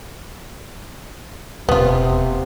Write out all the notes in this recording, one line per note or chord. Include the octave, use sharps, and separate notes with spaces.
E1 D#2 C3 B3 F4